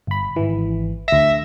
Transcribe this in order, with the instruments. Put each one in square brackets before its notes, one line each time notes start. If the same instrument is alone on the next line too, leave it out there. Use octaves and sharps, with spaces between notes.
[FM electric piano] G1 B5
G#1 E3
[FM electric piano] D2 A#6 [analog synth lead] E5